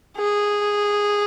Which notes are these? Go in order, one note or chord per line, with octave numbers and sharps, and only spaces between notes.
G#4